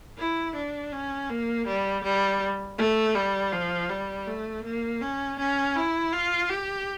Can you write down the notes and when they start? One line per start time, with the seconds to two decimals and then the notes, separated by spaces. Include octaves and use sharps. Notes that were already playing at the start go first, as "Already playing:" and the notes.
0.18 E4
0.55 D4
0.92 C#4
1.30 A#3
1.66 G3
2.04 G3
2.78 A3
3.15 G3
3.52 F3
3.90 G3
4.27 A3
4.64 A#3
5.01 C#4
5.39 C#4
5.75 E4
6.13 F4
6.50 G4